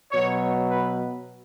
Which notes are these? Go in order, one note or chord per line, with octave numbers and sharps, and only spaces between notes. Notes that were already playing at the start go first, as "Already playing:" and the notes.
B2 F#3 C#5
B4